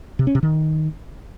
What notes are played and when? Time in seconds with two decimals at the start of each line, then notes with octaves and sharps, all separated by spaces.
0.19 C3
0.27 C#4
0.35 C3
0.43 D#3